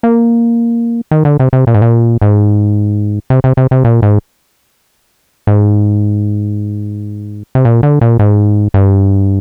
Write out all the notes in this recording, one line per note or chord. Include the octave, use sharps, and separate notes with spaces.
A#3
D#3
D3
C3
C3
A#2
G#2
A#2
G#2
C3
C3
C3
C3
A#2
G#2
G#2
C3
A#2
D3
A#2
G#2
G2